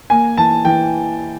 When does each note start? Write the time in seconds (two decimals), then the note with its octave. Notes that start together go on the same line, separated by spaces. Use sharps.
0.10 A#3 G#5
0.37 E3 A5
0.65 E3 G5